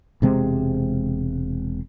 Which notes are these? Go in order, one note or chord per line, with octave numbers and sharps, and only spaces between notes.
E1 C3 G#3 C4